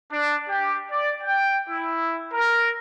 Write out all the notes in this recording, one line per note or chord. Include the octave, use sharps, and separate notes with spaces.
D4
G4
D5
G5
E4
A#4